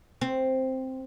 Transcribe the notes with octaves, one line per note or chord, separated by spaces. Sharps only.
C4